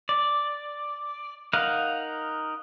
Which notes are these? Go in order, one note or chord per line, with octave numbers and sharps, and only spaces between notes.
D5
D#4 A#4 F5 F#5